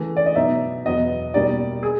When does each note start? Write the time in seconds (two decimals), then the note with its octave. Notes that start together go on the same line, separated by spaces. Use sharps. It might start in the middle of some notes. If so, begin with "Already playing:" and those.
Already playing: C#3 E3 A3
0.16 D5
0.26 D#5
0.36 B2 F#3 B3 D#4 E5
0.85 E2 B2 F#3 B3 D#5
1.34 B2 G3 A#3 D#4 D5
1.83 G#4